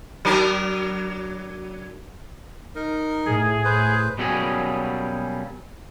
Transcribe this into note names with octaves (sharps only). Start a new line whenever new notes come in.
F#3 D4 A#4
D#4 A#4
A2 G#4
B4 C5
B2 F#3 G3 A#3 C#4 G#4